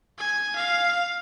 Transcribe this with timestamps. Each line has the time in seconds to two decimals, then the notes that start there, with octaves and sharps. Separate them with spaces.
0.19 G#5
0.56 F5